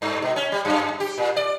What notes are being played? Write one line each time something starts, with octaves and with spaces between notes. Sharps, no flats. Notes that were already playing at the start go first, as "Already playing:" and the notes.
G2
B2
C#4
G3
F#2
G4
A#2
D5